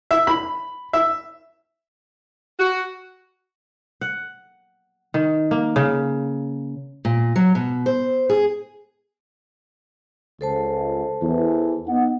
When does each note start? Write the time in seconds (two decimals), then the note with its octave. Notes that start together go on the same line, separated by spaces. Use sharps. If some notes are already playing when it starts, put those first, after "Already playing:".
0.11 E5
0.27 B5
0.93 E5
2.60 F#4
4.01 F#5
5.14 D#3
5.51 A#3
5.76 C#3
7.05 A#2
7.36 F#3
7.55 B2
7.86 C5
8.30 G#4
10.41 C#2 A4 C5 A5
11.22 E2 E3
11.87 B3 D#4 F#5